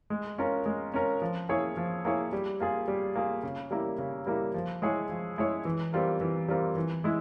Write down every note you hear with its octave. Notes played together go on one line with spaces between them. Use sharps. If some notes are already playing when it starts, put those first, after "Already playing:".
G#3
C#4 F4 A#4
G#3
C#4 F4 A#4
F3
A#3 E4 G#4 C#5
F3
A#3 E4 G#4 C#5
G3
A#3 F4 G#4
G3
A#3 F4 G#4
C#3
G3 A#3 E4 A#4
C#3
G3 A#3 E4 A#4
F3
G#3 E4 G#4 C#5
F3
G#3 E4 G#4 C#5
E3
G3 C4 F4 A#4
E3
G3 C4 F4 A#4
E3
G#3 E4